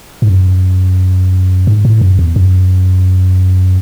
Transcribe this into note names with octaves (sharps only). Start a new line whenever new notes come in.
G#2
F#2
G#2
A2
F#2
E2
F#2